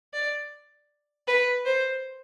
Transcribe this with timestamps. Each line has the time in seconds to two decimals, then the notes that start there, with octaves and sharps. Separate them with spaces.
0.13 D5
1.28 B4
1.66 C5